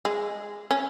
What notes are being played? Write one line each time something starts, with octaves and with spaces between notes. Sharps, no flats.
G#3
C#4